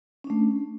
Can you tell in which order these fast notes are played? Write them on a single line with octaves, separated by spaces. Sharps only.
C#4 D4 A3